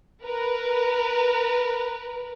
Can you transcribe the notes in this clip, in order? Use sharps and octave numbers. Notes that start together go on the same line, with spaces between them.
A#4 B4